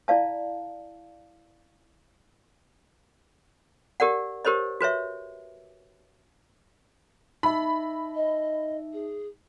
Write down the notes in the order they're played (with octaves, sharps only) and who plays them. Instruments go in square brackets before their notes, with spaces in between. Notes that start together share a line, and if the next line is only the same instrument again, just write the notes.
[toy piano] E4 D5 F5 A5
G4 A#4 D5 F#5
G4 A#4 C5 C#5 D#5
F#4 B4 C#5 E5
[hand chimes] D#4 E5 [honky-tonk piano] B5
[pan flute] D#5
G#4